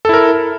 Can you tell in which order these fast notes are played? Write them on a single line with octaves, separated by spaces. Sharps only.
A4 E4 A#4